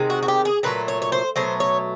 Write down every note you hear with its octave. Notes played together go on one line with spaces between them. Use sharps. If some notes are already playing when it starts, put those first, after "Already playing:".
Already playing: C3 D#3 G#3
F#4
F#4
G4
G#4
A#2 F#3 A3 B4
C#5
C#5
C5
B2 F#3 A3 C5
C#5